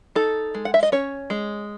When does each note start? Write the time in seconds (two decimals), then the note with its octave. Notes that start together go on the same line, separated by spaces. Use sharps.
0.15 D#4 A4
0.55 G#3
0.65 F#5
0.74 E5
0.83 D#5
0.92 C#4 C#5
1.30 G#3